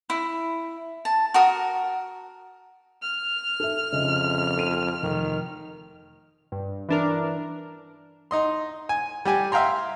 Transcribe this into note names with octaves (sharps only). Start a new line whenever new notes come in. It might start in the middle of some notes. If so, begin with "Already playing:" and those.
E4
A5
F#4 A#4 D#6
F6
A4 E5
F2 C#3 D#5 E5
A4 D#7
F1 D#3
G2
E3 D4 A#4
D#4 D#5 C6
G#5
G3 G4 G#5
E5 F5 G5 A#5 C6